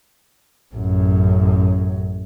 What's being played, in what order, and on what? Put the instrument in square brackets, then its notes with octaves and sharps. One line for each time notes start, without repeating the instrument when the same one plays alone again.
[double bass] A1 F#2